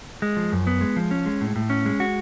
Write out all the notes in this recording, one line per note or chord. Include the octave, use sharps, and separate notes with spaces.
G#3
F3
F#2
B3
G#3
F3
C#4
G#3
A2
A2
C#4
G#3
F#4